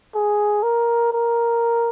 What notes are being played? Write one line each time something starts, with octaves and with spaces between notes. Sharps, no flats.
G#4
A#4
A#4